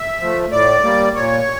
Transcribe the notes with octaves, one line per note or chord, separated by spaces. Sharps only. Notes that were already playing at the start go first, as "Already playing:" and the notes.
Already playing: E5
F3 A3
A2 D5
G3 A#3
A#2 C#5